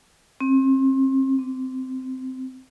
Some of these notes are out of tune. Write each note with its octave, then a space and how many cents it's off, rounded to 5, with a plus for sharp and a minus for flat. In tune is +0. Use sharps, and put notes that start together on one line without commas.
C4 +35
C4 -15